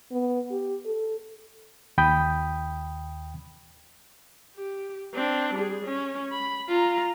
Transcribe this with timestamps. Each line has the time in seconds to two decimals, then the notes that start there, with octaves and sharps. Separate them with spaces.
0.11 B3
0.51 G4
0.85 A4
1.98 D#2 G5 B5 D#6 G6
4.56 G4
5.15 C4 D4
5.55 G3 G#4
5.84 C#4
6.32 B5
6.69 F4 A#5